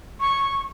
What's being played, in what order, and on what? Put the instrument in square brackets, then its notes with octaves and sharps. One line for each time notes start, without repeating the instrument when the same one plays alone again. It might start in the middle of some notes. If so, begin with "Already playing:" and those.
[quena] C#6